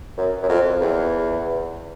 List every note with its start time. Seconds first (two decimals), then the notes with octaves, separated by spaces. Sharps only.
0.17 F#2
0.42 F#2
0.49 F2
0.81 E2